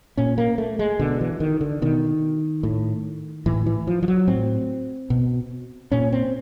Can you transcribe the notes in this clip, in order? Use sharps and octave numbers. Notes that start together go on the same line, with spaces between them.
A#2 C#4
A#3
A3
G#3
B2 D3
E3
D#3
D3
B2 D#3
A2
A2 E3
E3
F3
F3
F#3
A2 C4
B2
A#2 C#4
C4